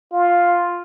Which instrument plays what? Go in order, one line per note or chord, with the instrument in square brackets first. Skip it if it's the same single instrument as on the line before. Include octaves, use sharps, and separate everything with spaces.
[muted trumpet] F4